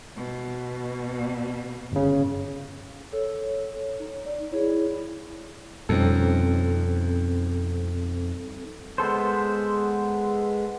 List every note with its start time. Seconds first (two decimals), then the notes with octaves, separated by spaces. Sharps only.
0.17 B2
1.92 G1 C#3
3.13 A4 C#5
4.00 D#4
4.26 D5
4.52 E4 G#4 C#5
5.89 F2 B2 G3 C4 C#4 D#4 A4
8.98 G#3 B3 A4 C5